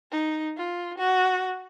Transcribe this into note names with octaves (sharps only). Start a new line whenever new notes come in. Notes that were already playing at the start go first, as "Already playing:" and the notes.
D#4
F4
F#4